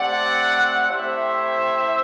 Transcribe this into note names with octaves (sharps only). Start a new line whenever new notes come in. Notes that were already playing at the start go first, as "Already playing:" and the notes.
Already playing: A3 C4 G4 D5 F#5
A3 C4 E4 G4 C5 E5